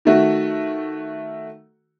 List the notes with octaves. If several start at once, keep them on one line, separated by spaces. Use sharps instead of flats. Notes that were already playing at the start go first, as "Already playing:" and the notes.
D#3 A3 F#4